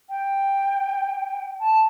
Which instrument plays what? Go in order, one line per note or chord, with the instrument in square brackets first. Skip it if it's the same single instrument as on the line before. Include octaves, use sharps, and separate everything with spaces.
[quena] G5
A5